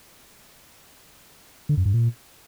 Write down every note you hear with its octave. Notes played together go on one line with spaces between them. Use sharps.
D3
F#2
G2
A#2